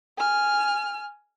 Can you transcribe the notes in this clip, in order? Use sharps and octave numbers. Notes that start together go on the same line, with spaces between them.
G#5 F6